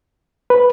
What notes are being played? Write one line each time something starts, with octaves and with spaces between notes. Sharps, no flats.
B4